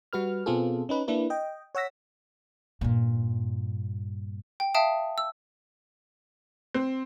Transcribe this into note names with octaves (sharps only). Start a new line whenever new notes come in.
G3 F#4 B4 F6
B2 B3 C4 F4 G#4 A4
C#4 D#4 B4
A#3 D4 E4 B4
D#5 G5
C#5 F#5 E6 A#6 B6
G2 A#2
G5
E5 F5 G5 A5 D#6
E6
C4